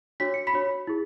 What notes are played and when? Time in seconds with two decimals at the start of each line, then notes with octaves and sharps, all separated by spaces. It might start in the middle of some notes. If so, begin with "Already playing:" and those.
0.20 D4 F#4 C#5 B6
0.34 C#7
0.47 B5 B6
0.53 D4 F#4 C#5
0.87 E4 G#4